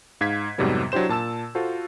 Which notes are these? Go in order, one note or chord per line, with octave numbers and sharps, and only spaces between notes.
G#2 F5 G#6 B6
F2 G#2 C3 F#3 G3 B3
F#3 D4 E4 G4 C5 E7
A#2 A5 E6 E7
F4 F#4 A4 C5